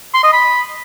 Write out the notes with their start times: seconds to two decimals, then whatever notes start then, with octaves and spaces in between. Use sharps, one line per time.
0.14 C6
0.24 D#5
0.33 B5